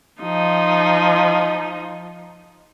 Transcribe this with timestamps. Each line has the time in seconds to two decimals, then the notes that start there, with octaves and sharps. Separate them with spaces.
0.22 F3 D#4